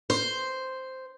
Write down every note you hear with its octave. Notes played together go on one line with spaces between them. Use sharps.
C5